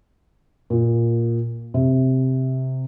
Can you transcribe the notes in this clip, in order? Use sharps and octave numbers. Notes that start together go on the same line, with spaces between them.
A#2
C3